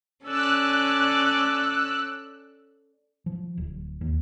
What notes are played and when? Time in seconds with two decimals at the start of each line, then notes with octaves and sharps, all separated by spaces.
0.24 C#4 A4 D5 E6 F#6
3.26 F3
3.57 D1
4.01 D#2